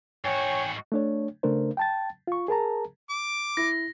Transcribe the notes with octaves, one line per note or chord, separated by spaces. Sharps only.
G#2 F#4 C#5 G5 G#5
A3 D4 C#5
C#3 A3 D4 A#4 C5
G5 A5 A6
F4 C#6
G#4 A#4 A5 A#5
D6
E4 A#6